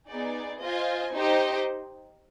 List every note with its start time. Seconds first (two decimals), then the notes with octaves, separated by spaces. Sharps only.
0.09 B3 D#4 G#4 D5
0.62 F4 C5 D#5 G#5
1.14 D#4 G4 C5 D#5